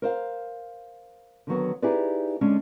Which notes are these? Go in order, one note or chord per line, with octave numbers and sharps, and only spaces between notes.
A#4 C5 F5
D3 D#3 F#3 B3
D#4 E4 G4 G#4 B4 D5
D3 G#3 C#4 D4